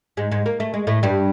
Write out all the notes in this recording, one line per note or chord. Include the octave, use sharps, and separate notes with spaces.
G#2 G#3
G#2 G#3
A#3
A3
G#3
A2 A3
G2 G3